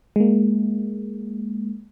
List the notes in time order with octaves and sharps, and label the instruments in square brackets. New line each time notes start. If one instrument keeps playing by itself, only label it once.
[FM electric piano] G#3 A#3